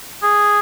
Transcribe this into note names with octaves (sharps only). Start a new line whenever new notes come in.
G#4